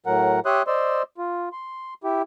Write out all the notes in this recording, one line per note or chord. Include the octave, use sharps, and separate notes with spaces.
A2 F#3 A#4 F#5
G4 C#5 E5 C6 D#6 F#6
C5 D5 D#5 C6 E6
F4
C6
E4 G4